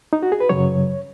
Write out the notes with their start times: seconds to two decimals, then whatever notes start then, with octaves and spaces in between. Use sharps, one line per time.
0.13 D#4
0.23 F#4
0.32 G#4
0.40 B4
0.49 F#2 C#3 F#3 C#5